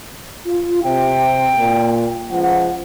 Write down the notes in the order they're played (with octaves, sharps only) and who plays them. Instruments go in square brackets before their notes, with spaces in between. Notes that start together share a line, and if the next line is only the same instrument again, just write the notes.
[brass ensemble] F4
[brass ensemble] C3 [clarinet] G5
[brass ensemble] A#2
C#2 F3 F#5